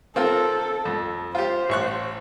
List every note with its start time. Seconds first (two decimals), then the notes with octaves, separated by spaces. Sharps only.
0.16 C4 F4 A4 A#4
0.85 F2
1.35 F4 G4 C5
1.69 A1 C#6 F#6